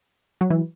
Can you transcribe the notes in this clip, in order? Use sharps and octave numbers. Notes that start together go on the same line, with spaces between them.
F#3
E3